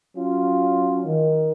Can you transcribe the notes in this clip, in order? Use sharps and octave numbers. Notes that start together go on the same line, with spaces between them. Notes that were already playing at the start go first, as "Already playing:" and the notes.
F#3 C#4 F4
D#3